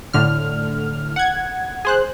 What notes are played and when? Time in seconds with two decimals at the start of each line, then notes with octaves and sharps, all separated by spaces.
0.13 A2 D3 F6
1.16 F#5 G#6
1.85 G#4 C5 F#6